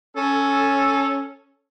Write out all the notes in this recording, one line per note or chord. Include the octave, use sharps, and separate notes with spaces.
C#4 A4